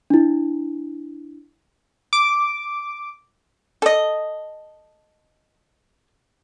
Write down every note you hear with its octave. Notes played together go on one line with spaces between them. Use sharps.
D4 E4
D6
A4 D#5